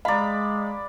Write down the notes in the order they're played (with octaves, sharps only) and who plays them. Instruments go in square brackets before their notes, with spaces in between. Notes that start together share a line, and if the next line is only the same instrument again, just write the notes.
[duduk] G#3 [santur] D5 B5 [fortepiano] F5 A#5